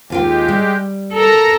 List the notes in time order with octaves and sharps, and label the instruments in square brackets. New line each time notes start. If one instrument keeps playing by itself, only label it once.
[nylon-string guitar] D#2 F4 G5 [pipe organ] G#3 G4
[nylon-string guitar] G3
[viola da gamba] A4 A#4 [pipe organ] A#5